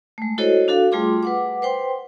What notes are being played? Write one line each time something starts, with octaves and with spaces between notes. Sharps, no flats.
G#3 A3
E4 F#4 A4 C5 C#5 D#5
D4 F#4 A4 F5
G3 A3 F4 G#4 C6 D6
B4 F#5 D6
B4 C5 G5 C6